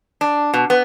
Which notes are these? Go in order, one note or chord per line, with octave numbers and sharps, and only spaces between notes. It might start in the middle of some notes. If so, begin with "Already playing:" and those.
D4
B2
B3